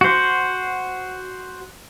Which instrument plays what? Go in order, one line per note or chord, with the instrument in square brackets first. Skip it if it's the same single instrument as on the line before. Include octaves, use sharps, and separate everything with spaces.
[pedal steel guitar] F#4 C5